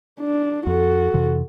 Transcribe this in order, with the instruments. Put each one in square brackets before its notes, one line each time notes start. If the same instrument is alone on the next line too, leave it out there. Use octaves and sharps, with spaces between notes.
[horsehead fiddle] D4
[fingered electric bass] F2 [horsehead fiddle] F#4 A4
[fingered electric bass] F2 C3 E3